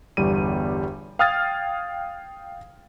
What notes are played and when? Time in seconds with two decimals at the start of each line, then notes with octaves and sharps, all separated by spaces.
0.17 G1 E2 G3 D#7
1.19 F5 G5 D#6 F6 G#6 A6